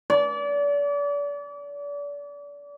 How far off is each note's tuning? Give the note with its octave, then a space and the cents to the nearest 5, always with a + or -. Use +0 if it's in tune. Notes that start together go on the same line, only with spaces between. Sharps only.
D5 -35